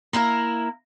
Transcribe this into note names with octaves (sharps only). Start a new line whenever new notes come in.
A#3 E4 F#4 A#4